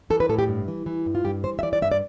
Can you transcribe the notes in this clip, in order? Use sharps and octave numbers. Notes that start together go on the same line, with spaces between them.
E3 A4
B4
A2 A4
G4
G2
E3
E3
G2
F4
G2 G4
E3 C5
E5
E3 D5
D5
G2 E5
D5